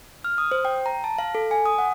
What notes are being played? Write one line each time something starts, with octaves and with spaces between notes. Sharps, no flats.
F6
D#6
C5
G5
A#5
A5
F5
A4
G#5
D#6
F#5